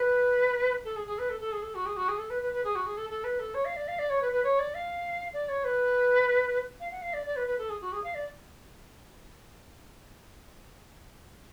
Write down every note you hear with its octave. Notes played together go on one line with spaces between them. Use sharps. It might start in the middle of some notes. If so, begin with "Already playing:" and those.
Already playing: B4
A4
G#4
G#4
B4
A4
A4
G#4
A4
F#4
G#4
F#4
G#4
A4
B4
B4
B4
G#4
F#4
G#4
A4
A4
B4
A4
C#5
F5
D5
F5
D5
C#5
B4
B4
C#5
D5
F5
D5
C#5
B4
F5
F#5
F5
D5
D5
B4
B4
A4
G#4
F#4
G#4
F5
D5